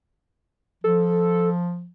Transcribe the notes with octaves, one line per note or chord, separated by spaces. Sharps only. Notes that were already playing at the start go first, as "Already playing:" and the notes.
F3 A4